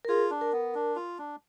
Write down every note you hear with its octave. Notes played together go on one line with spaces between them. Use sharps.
A#4
F4 G#4
D4
A#4
B3
D4
F4
D4